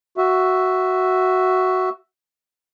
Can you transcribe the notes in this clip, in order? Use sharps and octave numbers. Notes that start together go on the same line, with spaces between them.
F#4 E5